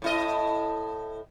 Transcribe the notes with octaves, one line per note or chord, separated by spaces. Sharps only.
A2 E4 D#5